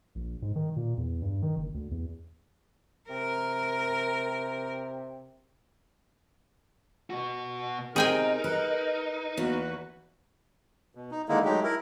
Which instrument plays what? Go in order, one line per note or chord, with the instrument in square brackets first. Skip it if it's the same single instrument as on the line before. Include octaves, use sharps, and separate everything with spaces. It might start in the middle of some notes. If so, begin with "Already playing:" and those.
[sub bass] A#1
G#2
D#3
A#2
E2
G2
D#3
F#1
D2
E2
[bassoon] C3 [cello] A#4
[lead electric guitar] B2 F#4
[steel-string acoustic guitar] C3 [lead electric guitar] D#4 [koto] G#4 G5 G#5 [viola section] A#4
[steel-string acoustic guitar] B4
[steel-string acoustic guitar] E2 [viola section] A#3 F#4 B4
[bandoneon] B2
D#4
D3 D#3 G#3 A#3 D#4 E4
F#3 G#3 A3 D#4 G4
E4 A#4